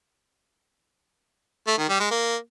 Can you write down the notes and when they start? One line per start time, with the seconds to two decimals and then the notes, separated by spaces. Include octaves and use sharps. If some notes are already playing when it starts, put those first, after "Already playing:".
1.67 A3
1.78 D#3
1.89 G3
2.00 G#3
2.11 A#3